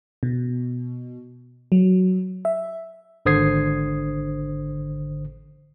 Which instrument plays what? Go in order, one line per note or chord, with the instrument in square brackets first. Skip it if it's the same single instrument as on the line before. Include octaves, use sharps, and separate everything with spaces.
[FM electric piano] B2
F#3
E5
[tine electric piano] G#1 D3 C5 D#6 G#6 C7